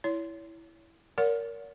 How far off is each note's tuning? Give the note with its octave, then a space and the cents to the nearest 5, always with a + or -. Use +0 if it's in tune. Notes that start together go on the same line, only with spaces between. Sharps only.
E4 +0 C#5 +30
A#4 +0 C#5 +45 F#5 -35